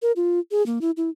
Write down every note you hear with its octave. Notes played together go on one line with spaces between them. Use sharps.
A#4
F4
G#4
A#3
E4
E4